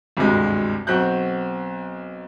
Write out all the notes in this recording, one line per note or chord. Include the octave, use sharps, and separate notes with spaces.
G#1 D2 G2 C3 G#3
B1 C4 F#4 F#6 G6